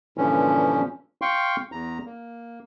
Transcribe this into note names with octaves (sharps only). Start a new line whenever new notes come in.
G2 A#2 D3 E3 F3 C#4
F5 G5 C6 C#6
E2 A#5
A#3